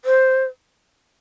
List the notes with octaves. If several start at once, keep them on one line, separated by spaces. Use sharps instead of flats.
C5